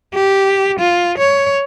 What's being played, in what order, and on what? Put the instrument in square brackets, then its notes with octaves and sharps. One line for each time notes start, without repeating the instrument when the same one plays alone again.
[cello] G4
F4
C#5